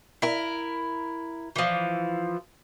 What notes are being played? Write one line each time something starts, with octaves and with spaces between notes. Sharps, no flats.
E4 A#4
E3 F3